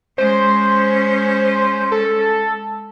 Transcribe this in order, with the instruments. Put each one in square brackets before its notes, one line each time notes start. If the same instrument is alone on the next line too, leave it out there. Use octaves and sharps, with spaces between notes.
[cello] G#3 C#4 [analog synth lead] C5
[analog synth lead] A4